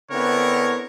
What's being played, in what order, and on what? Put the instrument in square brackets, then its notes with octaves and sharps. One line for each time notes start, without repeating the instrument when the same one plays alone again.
[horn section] D3 B3 C4 E4 A#4 C#5